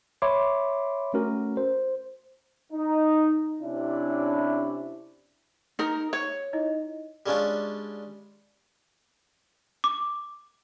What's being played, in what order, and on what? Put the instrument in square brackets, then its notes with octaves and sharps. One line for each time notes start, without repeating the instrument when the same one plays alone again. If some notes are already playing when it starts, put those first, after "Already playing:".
[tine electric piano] C#5 E5 B5 C6 D6
A3 C#4 F#4 A#4
C5
[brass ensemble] D#4
C3 C#4 D4 E4
[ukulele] D#4 A#4
C#5
[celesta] D#4 E4 D#5
[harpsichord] G3 G#3 C#4 D4 F4
[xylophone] D6